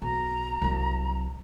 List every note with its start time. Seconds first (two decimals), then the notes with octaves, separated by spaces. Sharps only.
0.02 B1 A#5
0.62 C2 F#3